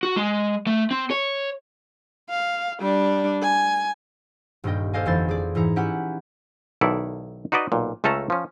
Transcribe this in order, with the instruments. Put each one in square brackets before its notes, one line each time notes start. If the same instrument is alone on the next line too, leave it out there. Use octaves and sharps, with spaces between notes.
[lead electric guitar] F#4
G#3
A3
C4
C#5
[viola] F5
G3 D4
G#5
[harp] D#1 G2 A#3 D#5 G5
A4 C5 D5 D#5 F5 G#5
G1 F2 E3 E4 C5 A6
G#4 D5
G#2 E3 E4 A#5 C#7
C#4 E4 G4 E5 F#5 G#5
[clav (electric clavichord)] B1 D#3 E4 A4 D5
D#4 F#4 B4 D5 D#5
B1 A#2
C#2 A3 C#4 A4 A5 A#5
F3 C#4